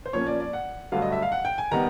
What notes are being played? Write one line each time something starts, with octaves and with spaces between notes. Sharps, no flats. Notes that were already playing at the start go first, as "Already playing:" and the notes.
C5
A#2 F3 A#3 C#4 C#5
D5
D5
F#5
G2 D3 F#3 A3 F5
D#5
E5
F5
F#5
G5
G#5
D#3 G3 B3 A#5